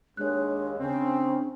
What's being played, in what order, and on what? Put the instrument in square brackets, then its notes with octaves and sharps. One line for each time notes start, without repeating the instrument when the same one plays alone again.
[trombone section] D#2 [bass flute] G#3 [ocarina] D4 [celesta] C#5 F#6
[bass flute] C#3 [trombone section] C4 [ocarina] D4